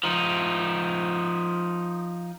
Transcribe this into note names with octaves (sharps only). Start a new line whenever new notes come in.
F3 D#4